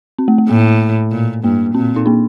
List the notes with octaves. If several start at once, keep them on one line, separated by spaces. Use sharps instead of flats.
C4
A3
A3
A2 A#3
A#2
G2 A#3
A#2 C4
D#4
A#3 D4